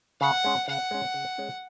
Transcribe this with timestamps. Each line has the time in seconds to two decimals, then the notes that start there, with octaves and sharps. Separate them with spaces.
0.21 C#3 F#5
0.44 G#3 C#4
0.68 C#3 F#5
0.91 G#3 C#4
1.14 C#3
1.38 G#3 C#4